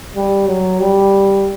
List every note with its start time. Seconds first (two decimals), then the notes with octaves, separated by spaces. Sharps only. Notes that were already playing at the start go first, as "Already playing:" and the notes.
0.16 G3
0.47 F#3
0.80 G3